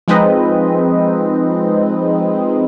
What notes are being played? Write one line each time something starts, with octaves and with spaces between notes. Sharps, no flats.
F3 G#3 C4 D#4 B4 D#5